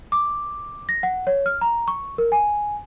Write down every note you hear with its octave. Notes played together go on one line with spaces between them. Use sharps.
D6
A#6
F#5
C#5
F6
A#5
C#6
A#4
G#5